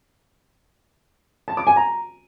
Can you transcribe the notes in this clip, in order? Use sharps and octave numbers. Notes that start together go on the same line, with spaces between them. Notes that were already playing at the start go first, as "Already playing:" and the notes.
A5
D6
G#5
A#5